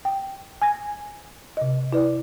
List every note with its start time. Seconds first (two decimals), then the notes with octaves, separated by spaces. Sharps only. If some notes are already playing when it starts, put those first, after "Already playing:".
0.05 G5
0.62 G#5 G#6 A#6
1.57 C3 D#5
1.93 E4 B4 D5